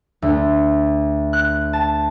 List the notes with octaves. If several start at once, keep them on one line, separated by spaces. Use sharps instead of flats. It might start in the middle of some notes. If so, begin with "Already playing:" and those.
D2
F#6
A5